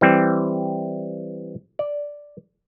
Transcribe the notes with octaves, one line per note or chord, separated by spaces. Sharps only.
E3 G3 C4
D5